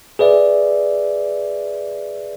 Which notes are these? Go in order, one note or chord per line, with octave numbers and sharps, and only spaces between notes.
G#4 B4 D5 E5